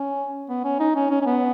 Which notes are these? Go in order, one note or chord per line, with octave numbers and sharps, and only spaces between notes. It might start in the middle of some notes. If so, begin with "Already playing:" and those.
Already playing: C#4
B3
C#4
D#4
C#4
C#4
C#4
B3